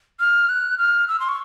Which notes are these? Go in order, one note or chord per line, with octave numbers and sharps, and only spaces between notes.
F6
F#6
F6
E6
C6
C#6